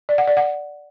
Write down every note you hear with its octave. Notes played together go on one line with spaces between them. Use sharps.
D5
F#5
D5
F#5